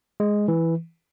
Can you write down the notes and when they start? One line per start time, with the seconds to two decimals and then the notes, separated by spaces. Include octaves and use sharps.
0.20 G#3
0.48 E3